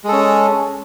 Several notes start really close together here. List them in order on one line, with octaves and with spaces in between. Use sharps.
G#3 A4 C#4